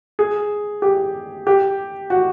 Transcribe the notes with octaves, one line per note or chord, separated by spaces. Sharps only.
G#4
G4
G4
F#4